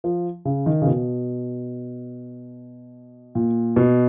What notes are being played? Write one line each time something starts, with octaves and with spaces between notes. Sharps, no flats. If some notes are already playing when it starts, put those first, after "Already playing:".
F3
C#3
D#3
C#3
B2
A#2
B2